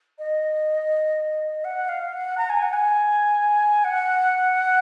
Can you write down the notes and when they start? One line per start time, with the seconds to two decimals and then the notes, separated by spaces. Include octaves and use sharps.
0.18 D#5
1.64 F#5
1.88 F5
2.13 F#5
2.38 A#5
2.49 G#5
2.62 F#5
2.73 G#5
3.84 F#5